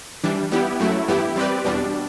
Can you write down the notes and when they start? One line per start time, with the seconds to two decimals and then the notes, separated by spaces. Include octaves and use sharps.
0.24 E3 G3 D4
0.51 G3 B3 E4 G4
0.80 F#2 F#3 A3 E4
1.08 G2 E3 B3 E4 G4
1.36 G3 C4 G4 B4 D5
1.65 E2 B2 G3 D4